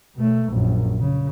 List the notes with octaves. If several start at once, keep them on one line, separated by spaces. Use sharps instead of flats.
B2 A3
A#1 F#2
C#3